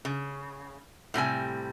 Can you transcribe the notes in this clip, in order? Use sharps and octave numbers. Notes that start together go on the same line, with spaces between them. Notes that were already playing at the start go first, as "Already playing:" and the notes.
C#3
A2 C3 G3 G#5